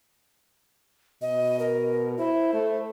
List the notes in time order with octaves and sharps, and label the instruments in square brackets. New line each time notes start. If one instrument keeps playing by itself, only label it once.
[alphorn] B2 [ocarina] D#5
[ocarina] A#4
[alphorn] E4 [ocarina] C5
[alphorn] A3